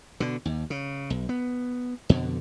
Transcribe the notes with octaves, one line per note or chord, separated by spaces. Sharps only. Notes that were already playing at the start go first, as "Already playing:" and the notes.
B2 D3
D#2
C#3
B1
B3
F2 B2 D3